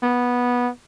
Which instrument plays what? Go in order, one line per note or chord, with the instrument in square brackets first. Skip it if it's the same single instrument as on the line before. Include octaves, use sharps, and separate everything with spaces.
[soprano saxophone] B3